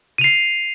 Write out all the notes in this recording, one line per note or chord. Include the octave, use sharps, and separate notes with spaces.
C7 D#7 F7